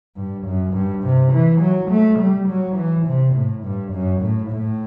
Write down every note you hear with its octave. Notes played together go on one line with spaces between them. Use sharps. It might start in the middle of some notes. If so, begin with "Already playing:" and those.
G2
F#2
G2
C3
E3
F#3
A3
G3
F#3
E3
C3
A2
G2
F#2
A2
A2